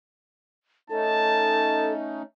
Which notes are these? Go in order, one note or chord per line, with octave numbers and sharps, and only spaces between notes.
A3 C#4 D#4 A4 A5